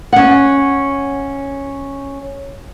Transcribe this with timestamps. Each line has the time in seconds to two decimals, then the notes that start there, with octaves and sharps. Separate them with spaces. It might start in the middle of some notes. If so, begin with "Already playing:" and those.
0.13 C#4 F#5